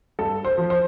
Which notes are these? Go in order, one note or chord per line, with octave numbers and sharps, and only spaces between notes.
G2 A4
C5
F3
C5